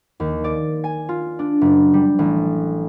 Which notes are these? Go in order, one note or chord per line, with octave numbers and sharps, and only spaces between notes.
D#2
D5
G#5
F4
D4
F#1
G3
A1